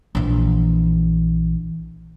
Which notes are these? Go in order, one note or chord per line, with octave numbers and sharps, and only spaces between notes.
A#1 E3